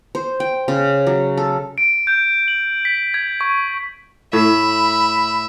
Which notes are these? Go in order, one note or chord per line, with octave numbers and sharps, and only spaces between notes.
C5
G5
C#3
F#3
A4
D7
G6
F#7
B6
G#6
C#6
A2 E5 B5